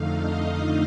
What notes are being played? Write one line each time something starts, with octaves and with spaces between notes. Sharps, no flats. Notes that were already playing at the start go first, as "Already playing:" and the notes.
Already playing: F2 D3 A3 D#4 F5
D#5